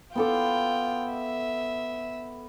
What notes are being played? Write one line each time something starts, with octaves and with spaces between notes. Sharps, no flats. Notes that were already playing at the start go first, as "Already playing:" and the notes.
B3 F4 A4 G5 D6
E5